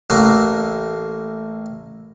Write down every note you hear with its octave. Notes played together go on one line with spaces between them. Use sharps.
A1 A2 A3 A#3